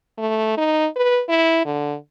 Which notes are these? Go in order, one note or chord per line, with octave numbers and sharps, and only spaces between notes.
A3
D#4
B4
E4
D3